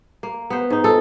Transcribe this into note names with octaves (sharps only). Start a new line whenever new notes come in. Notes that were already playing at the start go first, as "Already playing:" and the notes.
A#3
B3 C5
G#2 D#4
F4 A4 D#5